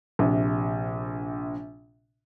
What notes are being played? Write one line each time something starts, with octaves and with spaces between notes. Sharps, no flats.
A#1 C3